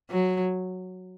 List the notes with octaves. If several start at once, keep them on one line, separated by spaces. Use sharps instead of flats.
F#3